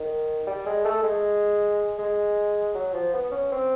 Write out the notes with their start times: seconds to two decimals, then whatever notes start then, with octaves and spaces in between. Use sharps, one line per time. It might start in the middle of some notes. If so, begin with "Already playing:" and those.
Already playing: D#3
0.47 G3
0.66 G#3
0.85 A3
1.03 G#3
1.99 G#3
2.75 F#3
2.94 F3
3.14 B3
3.32 C#4
3.52 C4